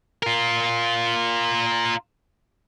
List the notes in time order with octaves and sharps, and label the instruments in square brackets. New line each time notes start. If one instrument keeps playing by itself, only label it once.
[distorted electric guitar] F4 A#4